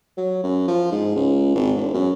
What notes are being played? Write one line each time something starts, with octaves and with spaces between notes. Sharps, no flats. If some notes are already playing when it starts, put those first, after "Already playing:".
F#3
F#2
F3
G#2
C#2
G#1
E1
F#2